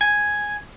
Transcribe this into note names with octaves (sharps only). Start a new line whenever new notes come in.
G#5